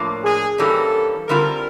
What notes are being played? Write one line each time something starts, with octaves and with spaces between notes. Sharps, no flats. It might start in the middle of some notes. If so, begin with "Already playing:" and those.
Already playing: A2 F3 A#3 D4
G#4
G2 E3 G3 A#3 C#4 A4
D3 G3 C4 F4 A#4